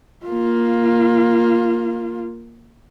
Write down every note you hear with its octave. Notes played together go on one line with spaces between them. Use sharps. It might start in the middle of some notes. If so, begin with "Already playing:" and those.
A#3 F4